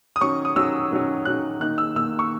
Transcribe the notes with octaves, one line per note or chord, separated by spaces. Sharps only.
D#6
D#3 F#3 C#4 C#6
D#6
D#3 F#3 C#4 E6
D#3 F#3 C#4
D#3 F#3 C#4 F#6
D#3 A#3 D#4 F#6
E6
D#3 A#3 D#4 E6
C#6